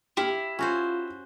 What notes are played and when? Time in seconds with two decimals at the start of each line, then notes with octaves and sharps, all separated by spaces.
0.17 E4 G4 F5
0.59 C#4 F4 F#4 C5